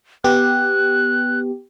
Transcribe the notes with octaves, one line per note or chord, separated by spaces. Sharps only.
B3 G4 F#6